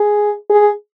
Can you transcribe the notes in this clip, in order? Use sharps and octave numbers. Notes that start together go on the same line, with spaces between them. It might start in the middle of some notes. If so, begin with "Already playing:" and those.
Already playing: G#4
G#4